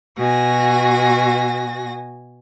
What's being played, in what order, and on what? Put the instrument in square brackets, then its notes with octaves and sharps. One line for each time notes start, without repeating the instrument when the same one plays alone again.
[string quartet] B2 F#4 G#5 A#6